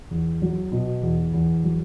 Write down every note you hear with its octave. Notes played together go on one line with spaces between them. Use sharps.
E2
F#3
B2
E2
E2
F#3